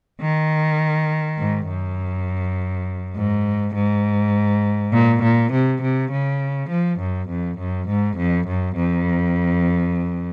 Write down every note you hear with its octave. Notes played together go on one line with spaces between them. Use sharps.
D#3
G#2
F#2
G#2
G#2
A#2
A#2
C3
C3
C#3
F3
F#2
F2
F#2
G#2
F2
F#2
F2